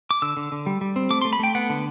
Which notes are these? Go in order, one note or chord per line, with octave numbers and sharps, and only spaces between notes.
D6
D3 E6
D3
D3
G3
G3
C4
A3 D6
C6
A3
B5
A3 G5
B3 F#5
D3